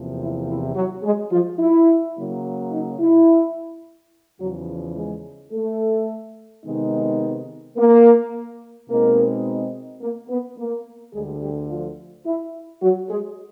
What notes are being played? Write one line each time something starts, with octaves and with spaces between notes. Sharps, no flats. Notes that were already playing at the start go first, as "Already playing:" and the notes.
Already playing: E2 C3 F3 A#3
E4
E4
F#3 F#4
G#3 G#4
F3 F4
E4
C#3 F#3 A#3
D#4
E4
E2 C#3 F3 F#3 F#4
G#3 G#4
A3 A4
C3 D#3 G#3 B3 D#4
A#3 A#4
B2 G#3 A#3 C4 D#4 A#4
A#3 A#4
B3 B4
A#3 A#4
D2 D3 G3 G#3 G#4
G3 G4
F3 F4
E4
F#3 F#4
G#3 G#4